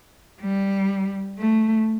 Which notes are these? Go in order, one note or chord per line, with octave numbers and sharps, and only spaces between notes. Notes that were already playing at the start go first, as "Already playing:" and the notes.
G3
A3